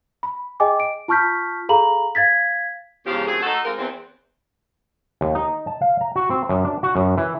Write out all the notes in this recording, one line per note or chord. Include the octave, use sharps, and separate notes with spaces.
B5
G#4 D#5 G5 G#5 D6
D7
F4 A5 C#6 F6 G6 B6
G#4 A4 F5 A#5 B5 F#7
F5 G#6 A6 B6
E2 G#2 C#3 F3 G4 F5
F#2 A3 C4 G#4
A3 D#4 F#4 A4
G#3 C4 F4 A#4
E2 C4
D#2
D#4
A5
F5
A#5
F#4
C4
F#2
D4
F#4
F#2
E3